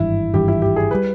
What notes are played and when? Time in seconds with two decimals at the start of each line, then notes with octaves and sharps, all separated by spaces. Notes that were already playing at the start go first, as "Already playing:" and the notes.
Already playing: G#1 G2 E3 E4
0.34 G#1 G2 E3 G4
0.48 E4
0.62 G4
0.76 G#4
0.91 G3 B4